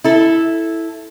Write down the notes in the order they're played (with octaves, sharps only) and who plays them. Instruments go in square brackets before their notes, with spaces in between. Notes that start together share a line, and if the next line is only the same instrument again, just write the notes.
[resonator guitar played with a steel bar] E4 A4